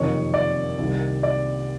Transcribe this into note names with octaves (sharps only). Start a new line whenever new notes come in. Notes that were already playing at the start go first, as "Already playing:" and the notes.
Already playing: F#1 F2 C3 D#3 C#5
D5
C2 C3 D#3
D5